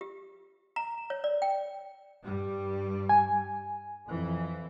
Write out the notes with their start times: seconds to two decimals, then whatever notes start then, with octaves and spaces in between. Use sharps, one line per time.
0.01 G4
0.76 A#5
1.10 C#5
1.24 D5
1.42 G5
2.24 G2 G3
3.09 G#5
4.06 F2 E3